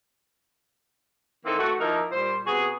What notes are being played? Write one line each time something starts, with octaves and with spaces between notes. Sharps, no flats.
E3 A#3 C4 D#4 A4
A3 F#4
F3 A#3 D#4 E4 A#4
A#2 G3 C5
C3 B3 F#4 G#4